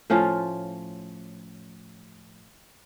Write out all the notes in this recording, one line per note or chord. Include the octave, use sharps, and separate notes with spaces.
A2 F3 C#4 F4